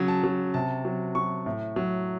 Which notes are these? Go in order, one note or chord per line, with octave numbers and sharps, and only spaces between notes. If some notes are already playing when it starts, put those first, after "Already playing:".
Already playing: C#3 F#3
A5
F#3
C3 A5
F#3
F#3 C#6
A2
F#3